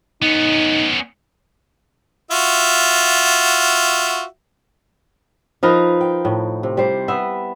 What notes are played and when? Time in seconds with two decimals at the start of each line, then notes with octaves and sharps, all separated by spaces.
0.22 B3 C#4 D#4
2.31 F4 F#4 E5
5.63 F3 D#4 A#4 B4
6.01 G5
6.25 A2
6.63 C3
6.77 G3 C5
7.08 B3 E5